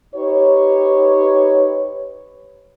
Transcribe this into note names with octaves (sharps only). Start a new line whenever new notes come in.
D#4 G4 B4 C#5